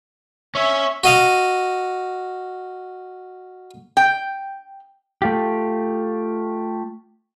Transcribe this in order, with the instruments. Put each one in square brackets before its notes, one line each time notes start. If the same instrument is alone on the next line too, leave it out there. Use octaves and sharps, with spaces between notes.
[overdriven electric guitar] C#4 C#5 [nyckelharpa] E5
[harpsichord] F#4 D#5 F5
[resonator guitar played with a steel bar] G5
[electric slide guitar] A3 F4 G4